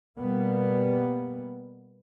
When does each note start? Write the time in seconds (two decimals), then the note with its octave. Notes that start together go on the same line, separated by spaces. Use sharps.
0.19 B2 G3 A#3 B3